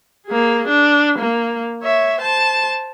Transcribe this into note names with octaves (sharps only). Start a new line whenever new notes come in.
A#3 G#4
D4
A#3
C#5 E5
C5 A5